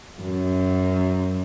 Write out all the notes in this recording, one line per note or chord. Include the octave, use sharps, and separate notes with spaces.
F#2